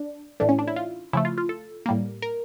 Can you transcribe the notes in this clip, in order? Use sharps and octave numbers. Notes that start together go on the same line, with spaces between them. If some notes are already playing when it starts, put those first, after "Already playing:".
Already playing: D4
A2 E3 A3 D4
C#4
D4
E4
F4
C#3 F3 A3 E4
F4
F4
A4
A2 G3 A#3
A#4